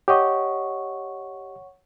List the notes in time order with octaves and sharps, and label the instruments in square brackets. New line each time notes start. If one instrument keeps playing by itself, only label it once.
[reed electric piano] G4 D#5 [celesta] C#5 F#5 C#6